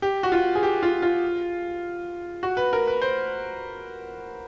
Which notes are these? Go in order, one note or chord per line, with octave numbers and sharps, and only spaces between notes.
G4
F#4
F4
G#4
G4
F4
F4
F#4
B4
A#4
B4
C5